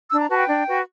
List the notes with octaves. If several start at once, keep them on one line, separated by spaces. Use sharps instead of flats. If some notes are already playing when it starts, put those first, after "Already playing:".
D4 E6
A#5
F#4 B4 A5
G5
D4
F#4 B4